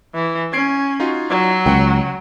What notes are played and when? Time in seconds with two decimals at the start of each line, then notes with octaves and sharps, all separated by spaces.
0.14 E3
0.53 C#4 G#6 C7 D7
1.00 D#4 F4 F#4
1.30 F#3
1.66 C#2 F#5 G5